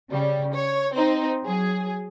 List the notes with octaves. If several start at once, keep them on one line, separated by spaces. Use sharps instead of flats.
C#3 G3
C#5
C4 D#4
F#3 G#4